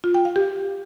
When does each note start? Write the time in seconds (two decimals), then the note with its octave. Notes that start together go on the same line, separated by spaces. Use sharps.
0.04 F4
0.14 G5
0.25 F5
0.36 G4